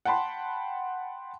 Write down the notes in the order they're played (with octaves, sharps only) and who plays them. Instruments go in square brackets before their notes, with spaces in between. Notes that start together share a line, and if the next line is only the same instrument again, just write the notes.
[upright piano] F#5 G5 A5 B5 C6